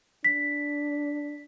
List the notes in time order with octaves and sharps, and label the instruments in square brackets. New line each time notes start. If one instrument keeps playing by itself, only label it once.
[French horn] D4 [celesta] B6